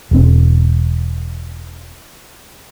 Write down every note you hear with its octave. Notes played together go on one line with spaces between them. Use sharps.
E1 C4